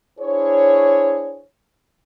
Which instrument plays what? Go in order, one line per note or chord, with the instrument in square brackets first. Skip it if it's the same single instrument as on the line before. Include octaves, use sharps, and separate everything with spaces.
[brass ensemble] D4 E4 G#4 C5 C#5